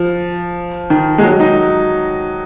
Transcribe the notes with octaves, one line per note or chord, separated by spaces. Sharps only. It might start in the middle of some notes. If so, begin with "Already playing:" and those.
Already playing: F3
D#3
G#3
F#3
D#4